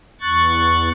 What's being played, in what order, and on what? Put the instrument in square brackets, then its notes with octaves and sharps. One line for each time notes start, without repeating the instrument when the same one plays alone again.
[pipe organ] E2 C#6 F#6 A6